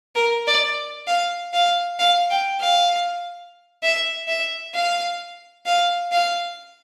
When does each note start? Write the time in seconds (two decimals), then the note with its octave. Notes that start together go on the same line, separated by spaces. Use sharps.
0.15 A#4
0.47 D5
1.07 F5
1.54 F5
1.99 F5
2.30 G5
2.60 F5
3.83 E5
4.28 E5
4.74 F5
5.66 F5
6.12 F5